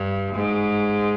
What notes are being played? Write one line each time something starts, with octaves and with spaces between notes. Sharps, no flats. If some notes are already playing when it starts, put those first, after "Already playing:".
Already playing: G2
G#2